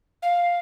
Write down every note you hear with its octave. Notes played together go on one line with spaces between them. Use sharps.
F5